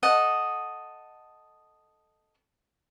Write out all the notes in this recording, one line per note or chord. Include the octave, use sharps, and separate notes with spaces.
A4 D#5 F#5